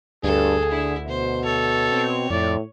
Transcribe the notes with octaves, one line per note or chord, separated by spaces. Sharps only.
D2 G2 G#4 A4
D3 E4 E5
B2 C5
A4 C#5
C4
F2 A2 D5